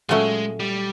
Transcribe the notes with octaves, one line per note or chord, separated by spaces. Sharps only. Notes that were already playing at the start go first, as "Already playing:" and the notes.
A#2 F#3 G#3 A3 C#4
G3